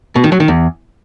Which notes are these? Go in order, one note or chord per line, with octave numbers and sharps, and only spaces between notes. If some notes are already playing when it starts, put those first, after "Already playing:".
B2
D#3
F#3
D#3
E2